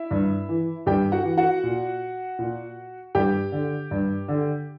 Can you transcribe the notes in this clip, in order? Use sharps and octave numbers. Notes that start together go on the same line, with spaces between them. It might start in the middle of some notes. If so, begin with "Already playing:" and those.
Already playing: E4 E5
G2
E3
G2 G4 G5
F#4 F#5
E3
F#4 F#5
A#2
A#2
G2 G4 G5
D3
G2
D3